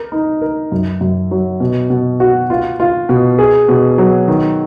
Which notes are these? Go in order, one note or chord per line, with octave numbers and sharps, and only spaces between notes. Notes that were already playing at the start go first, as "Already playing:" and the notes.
Already playing: A#4
D#4
A#4
F#2
F#2
F#3
B2
B2
F#4
F4
F4
B2
G#4
B2
F#3
D#3